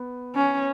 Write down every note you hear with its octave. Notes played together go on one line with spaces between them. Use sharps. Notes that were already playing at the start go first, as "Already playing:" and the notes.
Already playing: B3
C#4